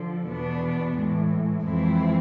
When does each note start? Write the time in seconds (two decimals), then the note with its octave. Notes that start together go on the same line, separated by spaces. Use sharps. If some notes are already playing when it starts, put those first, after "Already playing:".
Already playing: D3 F3
0.27 E2 B2 B3 D4
0.96 A2 E3 G#3
1.65 F2 E3 G#3 C4 E4